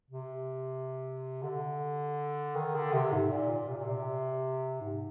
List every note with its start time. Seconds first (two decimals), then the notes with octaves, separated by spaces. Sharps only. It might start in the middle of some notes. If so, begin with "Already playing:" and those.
0.10 C3
1.43 D3
2.56 D#3
2.75 D3
2.93 C3
3.12 G#2
3.31 A#2
3.51 A#2
3.69 C3
3.77 A#2
3.85 C3
4.81 G#2